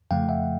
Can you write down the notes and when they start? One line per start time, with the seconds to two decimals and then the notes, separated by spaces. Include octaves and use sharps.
0.11 F2 C#3 F3 A3 F5 G5
0.29 E5 F#5